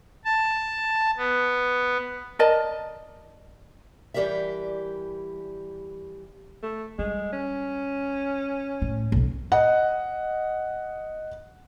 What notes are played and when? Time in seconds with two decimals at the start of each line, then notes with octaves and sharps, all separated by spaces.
0.25 A5
1.17 B3
2.39 A#4 D5 D#5 A5
4.14 E3 G3 G4 A#4 D5 E5
6.63 A3
6.99 G3 G#3
7.33 C#4
8.82 A2
9.12 B1 F#2
9.52 D#5 F#5